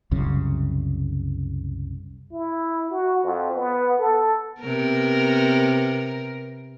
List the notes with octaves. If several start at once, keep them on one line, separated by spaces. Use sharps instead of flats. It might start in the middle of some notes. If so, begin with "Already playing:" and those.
C2 F#2 C#3
E4
F#4
F2
B3
A4
C3 B3 A#4